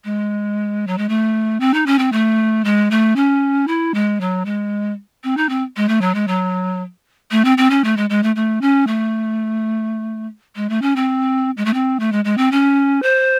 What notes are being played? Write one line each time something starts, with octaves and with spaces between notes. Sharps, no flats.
G#3
F#3
G#3
A3
C4
D#4
C#4
C4
A3
G#3
A3
C#4
E4
G#3
F#3
G#3
C4
D#4
C4
G#3
A3
F#3
G#3
F#3
A3
C4
C4
C#4
A3
G#3
G#3
A3
A3
C#4
A3
G#3
A3
C#4
C4
G#3
A3
C4
A3
G#3
G#3
C4
C#4
C5